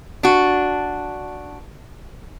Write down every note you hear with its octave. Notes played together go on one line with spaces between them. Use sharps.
D4 F#4